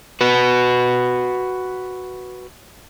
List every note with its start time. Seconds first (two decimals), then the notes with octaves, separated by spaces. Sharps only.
0.21 F#4 B4